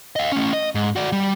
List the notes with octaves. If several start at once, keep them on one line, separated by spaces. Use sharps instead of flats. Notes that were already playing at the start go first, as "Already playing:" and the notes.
D#5 F5
A3 C#4
D#5
G#2
F#4 D5
G3